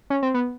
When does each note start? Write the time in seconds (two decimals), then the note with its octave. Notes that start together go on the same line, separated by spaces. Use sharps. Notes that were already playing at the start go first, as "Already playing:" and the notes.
0.10 C#4
0.23 C4
0.34 B3